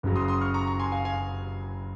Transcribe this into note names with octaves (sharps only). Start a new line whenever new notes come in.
F#1 F#2 C#3 F#3
C6 D#6
C6 D#6
C#6 F6
A#5 C#6
A#5 C#6
G#5 C6
F5 G#5
F5 G#5